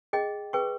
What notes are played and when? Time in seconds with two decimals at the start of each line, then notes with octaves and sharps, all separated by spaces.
0.13 G#4 D#5 G5
0.53 G#4 B4 G5 C#6